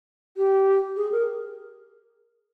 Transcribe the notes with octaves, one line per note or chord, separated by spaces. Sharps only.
G4
G#4
A#4